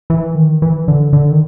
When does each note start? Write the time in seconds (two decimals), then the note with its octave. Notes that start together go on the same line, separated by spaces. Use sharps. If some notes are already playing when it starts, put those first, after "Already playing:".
0.10 E3
0.35 D#3
0.62 E3
0.88 D3
1.13 D3
1.31 D#3